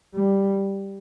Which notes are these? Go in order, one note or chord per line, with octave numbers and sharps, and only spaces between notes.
G3